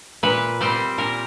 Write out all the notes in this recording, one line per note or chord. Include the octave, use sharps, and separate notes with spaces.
A#2 B4
G3 C4 C5
A#2 A#4